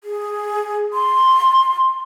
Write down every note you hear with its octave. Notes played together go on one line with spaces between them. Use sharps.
G#4
C6